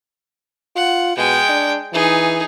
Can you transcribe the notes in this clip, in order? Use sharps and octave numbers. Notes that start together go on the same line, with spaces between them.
F4 F#5
B2 G#3 G5
D4
E3 D#4 G#4